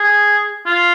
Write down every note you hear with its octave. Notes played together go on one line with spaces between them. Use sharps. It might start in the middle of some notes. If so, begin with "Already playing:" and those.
Already playing: G#4
F4